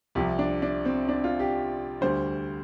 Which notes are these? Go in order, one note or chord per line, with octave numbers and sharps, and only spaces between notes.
C2 C3 F3 G4
D4
D4
C4
D4
F4
G4
D2 D3 G3 C5